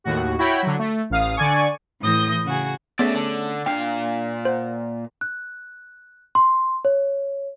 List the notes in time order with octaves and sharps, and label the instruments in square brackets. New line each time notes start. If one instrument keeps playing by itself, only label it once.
[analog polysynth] D#2 A2 F#4
E4 F#4 C#5 G5 B5
D3 F#3
A3
A1 F5 D#6
D3 D5 G#5 C#6
[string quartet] A2 E3 D#6 G6 A#6
C#3 F#4 G#4
[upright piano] A3 C#4 G#4 [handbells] B3 [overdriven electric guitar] D5 E5
[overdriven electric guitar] D3
[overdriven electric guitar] A#2 F5 [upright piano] D4 [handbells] G5
[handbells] C5 [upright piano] F#5
[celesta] F#6
C6
C#5